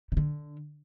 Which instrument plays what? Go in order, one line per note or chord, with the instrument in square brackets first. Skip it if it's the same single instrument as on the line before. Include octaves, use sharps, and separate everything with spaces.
[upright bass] C#3
D3